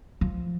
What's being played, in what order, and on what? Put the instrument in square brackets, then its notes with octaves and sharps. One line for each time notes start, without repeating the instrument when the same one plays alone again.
[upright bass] F3